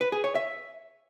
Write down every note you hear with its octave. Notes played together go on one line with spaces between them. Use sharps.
B4
G#4
C#5
E5